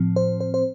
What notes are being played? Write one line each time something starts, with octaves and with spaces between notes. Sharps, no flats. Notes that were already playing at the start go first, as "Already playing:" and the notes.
Already playing: A2 F3 C4
C5
C5
C5